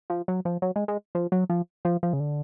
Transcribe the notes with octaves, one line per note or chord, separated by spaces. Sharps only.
F3
F#3
F3
F#3
G#3
G#3
F3
F#3
F3
F3
F3
C#3
D3